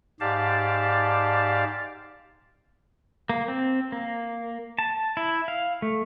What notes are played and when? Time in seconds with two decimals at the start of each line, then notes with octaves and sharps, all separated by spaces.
0.20 G#2 G4 D5 F5 A5
3.30 A#3
3.48 C4
3.92 A#3
4.79 A5
5.17 E4
5.48 F5
5.82 A3